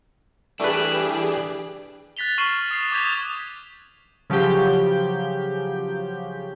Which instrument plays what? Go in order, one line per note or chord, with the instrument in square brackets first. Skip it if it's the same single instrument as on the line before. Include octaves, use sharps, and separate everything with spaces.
[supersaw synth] E3 G4 G#4 [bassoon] G3 [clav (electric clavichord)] A3 B4 [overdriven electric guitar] D4
[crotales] F#6 A6 B6 F7 G7
C#6 F6 C7 D#7 E7 F#7
D#6 C7
D6 D#6 G6 G#6 B6 F7
[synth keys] C#3 F3 F#3 G4 G6